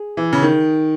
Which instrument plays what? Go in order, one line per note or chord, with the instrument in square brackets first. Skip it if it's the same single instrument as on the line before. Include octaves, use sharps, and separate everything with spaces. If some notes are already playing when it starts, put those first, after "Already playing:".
Already playing: [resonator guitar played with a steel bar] G#4
[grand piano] E3
C#3
D#3